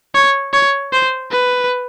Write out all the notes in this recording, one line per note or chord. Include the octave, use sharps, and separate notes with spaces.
C#5
C#5
C5
B4